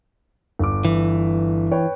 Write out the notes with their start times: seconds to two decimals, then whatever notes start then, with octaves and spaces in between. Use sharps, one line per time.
0.59 G1 D6
0.85 E3
1.72 B4 C#5 G5